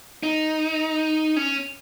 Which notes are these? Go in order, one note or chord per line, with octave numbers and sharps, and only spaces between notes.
D#4
C#4